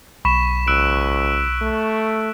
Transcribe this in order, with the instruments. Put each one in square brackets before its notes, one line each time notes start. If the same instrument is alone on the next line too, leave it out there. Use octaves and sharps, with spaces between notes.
[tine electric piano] B1 B5 [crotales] C#6 B6 E7
[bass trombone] C#2 [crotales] E6 F#6 D7
[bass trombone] A3